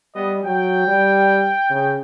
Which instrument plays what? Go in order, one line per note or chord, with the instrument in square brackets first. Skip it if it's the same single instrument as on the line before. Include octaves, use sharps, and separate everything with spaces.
[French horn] G3 [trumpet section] B3 D#5
[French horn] F#3 [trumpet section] G5
[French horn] G3
C#3